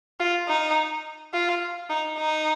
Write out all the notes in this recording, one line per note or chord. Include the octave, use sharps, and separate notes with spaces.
F4
D#4
F4
D#4
D#4